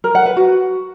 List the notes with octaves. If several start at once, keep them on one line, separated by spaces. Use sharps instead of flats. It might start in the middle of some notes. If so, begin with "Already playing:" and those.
A#4
F#5
B4
F#4